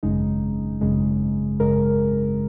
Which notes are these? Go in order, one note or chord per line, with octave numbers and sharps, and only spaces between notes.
G#1 F#2 C#3 G#3 D#4
G#1 F#2 C#3 G#3
G#1 F#2 C#3 G#3 A#4